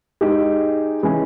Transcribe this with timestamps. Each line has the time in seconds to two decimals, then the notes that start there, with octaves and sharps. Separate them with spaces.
0.21 G#3 D#4 G4
1.03 E3 G#3 C#4 G#4